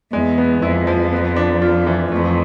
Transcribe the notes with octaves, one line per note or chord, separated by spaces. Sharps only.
E2 G#3
B3
F2 E4
F3
B3
D4
F4
E3
F2 A3